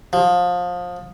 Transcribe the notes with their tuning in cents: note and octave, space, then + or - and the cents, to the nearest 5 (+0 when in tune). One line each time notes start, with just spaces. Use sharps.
F3 +25